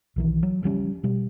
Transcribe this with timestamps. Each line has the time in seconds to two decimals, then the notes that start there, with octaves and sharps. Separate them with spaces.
0.16 B1 D#3 E3
0.43 F#3
0.63 C#3 F3 G3 C#4
1.03 B2 G3